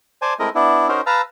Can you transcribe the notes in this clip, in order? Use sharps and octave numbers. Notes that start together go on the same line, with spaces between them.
C5 D5 G#5 A5
G#3 A3 C4 E4 A#4 D#5
B3 D4 E4
C#4 D#4 F#4 A#4 C5
B4 F5 A5 A#5 E6